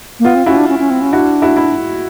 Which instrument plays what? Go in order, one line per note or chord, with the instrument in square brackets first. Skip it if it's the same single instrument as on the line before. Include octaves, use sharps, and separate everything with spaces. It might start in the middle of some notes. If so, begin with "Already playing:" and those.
[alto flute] A#3
[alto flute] B3 [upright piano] F4
[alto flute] C4
[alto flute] C#4 [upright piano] E4 F#4
[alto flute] D4
C#4
C#4
C4
C#4
[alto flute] D4 [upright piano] E4 F#4
[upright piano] E4 F#4
E4